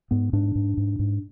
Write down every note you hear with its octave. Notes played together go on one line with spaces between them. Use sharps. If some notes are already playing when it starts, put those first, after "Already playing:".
G#2 B3
G#2 D4
G#2
G#2
G#2